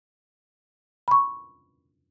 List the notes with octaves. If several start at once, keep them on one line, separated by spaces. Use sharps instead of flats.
B5 C#6